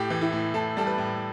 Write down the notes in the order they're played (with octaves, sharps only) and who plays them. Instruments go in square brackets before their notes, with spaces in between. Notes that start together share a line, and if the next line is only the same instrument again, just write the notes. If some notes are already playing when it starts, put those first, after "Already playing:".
Already playing: [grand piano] A2 G4
E3
E4
A2
A2 A4
G3 A4
B4
A2